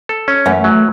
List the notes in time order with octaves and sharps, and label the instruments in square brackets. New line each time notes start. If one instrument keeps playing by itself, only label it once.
[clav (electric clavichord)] A4
C#4
[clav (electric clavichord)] F#2 [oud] E3 A3
[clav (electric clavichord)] F#3